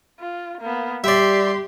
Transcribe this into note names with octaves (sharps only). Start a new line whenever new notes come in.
F4
A#3 B3
G3 G4 D5 E5 C6